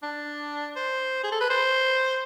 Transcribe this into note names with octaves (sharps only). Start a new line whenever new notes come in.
D4
C5
G#4
A4
B4
C5